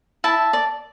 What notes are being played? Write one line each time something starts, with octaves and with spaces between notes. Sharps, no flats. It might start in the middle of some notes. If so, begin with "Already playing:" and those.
E4 E5 A5
D5